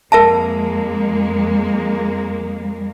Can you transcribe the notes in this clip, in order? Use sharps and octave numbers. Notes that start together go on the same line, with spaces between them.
F2 G#3 A#3 A#4 E5 A5